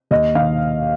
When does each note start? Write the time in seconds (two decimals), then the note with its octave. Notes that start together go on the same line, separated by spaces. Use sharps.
0.11 D#2 D#5
0.35 D#3 F5